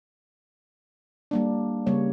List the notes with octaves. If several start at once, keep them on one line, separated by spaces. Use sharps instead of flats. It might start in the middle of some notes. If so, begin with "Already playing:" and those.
G3 A#3 D4
C#3 G3 A#3 C#5